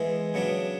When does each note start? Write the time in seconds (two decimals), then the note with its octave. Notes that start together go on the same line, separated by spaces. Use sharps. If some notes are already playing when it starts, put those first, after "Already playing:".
Already playing: E3 G#3 B3 E4
0.34 C#3 F#3 B3 D4